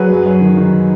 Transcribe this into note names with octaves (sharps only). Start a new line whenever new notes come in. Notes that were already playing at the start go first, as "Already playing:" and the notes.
Already playing: F#3 G#4 B4
F#2
F#2
D#3
D#3